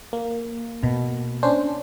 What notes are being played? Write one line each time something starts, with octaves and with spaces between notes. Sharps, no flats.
A#3
B2
C#4 D4 C5